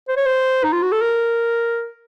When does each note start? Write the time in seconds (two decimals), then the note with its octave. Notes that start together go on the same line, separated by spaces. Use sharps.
0.08 C5
0.17 C#5
0.26 C5
0.64 D#4
0.73 F4
0.82 F#4
0.92 A4
1.01 A#4